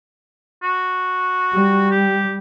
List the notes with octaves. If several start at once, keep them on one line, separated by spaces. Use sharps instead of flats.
F#4
G3
G4